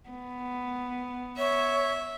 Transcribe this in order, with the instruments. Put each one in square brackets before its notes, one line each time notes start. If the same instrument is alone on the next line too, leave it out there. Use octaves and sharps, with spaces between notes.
[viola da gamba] B3
[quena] C#5 [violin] E5